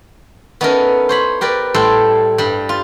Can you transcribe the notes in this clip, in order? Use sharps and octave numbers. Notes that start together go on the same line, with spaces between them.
B3 C#4 D#4 E4 A4 A#4
C5 C#5 B5
G4 A#4 B4 D5
A2 G3 E4 A4 C5 C6
G2 G3
F4